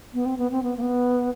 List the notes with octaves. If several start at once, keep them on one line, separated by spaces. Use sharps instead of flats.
B3
C4
B3
C4
B3
A#3
B3